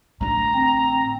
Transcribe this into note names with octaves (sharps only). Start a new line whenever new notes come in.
A1 D3 A#5
C4